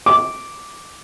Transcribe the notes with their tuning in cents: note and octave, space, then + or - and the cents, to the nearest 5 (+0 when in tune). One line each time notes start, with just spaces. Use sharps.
D6 -5